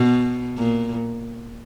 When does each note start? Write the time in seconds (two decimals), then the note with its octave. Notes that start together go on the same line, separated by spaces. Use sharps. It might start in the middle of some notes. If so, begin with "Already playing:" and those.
Already playing: B2
0.57 A#2